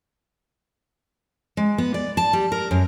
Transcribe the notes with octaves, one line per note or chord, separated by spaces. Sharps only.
G#3
B3
D5
A5
G3
A#4
F#2